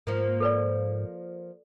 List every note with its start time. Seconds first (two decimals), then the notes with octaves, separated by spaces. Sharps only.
0.07 G#2 F3 A#3
0.40 A4 B4 D5